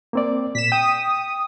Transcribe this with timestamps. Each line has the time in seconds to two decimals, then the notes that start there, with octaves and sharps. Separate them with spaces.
0.13 A#3 C4 D5
0.55 A#2 B6 E7
0.72 G5 D#6